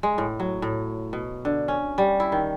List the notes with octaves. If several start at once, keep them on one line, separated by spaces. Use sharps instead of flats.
G#3
A2
F#3
A2
B2
D3
C#4
G3
E4
D#3